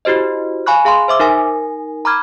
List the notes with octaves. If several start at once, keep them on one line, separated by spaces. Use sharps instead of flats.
E4 F#4 G4 C5 D#5
F5 G#5 B5 C#6 F#6
G#4 F5 A#5 C6
C5 E5 D6 E6
D#4 A#4 G#5 A#6
A#5 B5 D6 F6 G#6